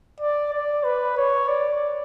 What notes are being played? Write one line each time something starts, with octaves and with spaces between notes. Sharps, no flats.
D5
D5
B4
C#5
D5